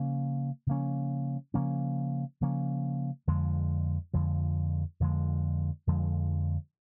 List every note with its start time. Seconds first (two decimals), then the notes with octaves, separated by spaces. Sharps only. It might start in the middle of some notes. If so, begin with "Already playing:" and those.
Already playing: C#3 F3 A#3 C#4
0.67 C#3 F3 A#3 C#4
1.54 C#3 F3 A#3 C#4
2.41 C#3 F3 A#3 C#4
3.27 F2 D3 F3 G#3
4.14 F2 D3 F3 G#3
5.00 F2 D3 F3 G#3
5.87 F2 D3 F3 G#3